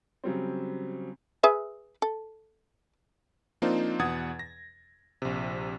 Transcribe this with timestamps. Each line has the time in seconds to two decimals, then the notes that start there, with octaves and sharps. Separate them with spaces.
0.24 C#3 F#3 G3 C4
1.43 G#4 B4 E5
2.02 A4
3.62 F3 A#3 C4 D4 D#4 F4
3.99 E2 B2 F#5 D#6 G#6 A6
4.39 A#6
5.22 A#1 C3